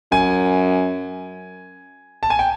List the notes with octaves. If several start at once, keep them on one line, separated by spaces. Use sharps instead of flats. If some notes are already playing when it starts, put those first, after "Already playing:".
F#2 G#5
A5
G#5
G5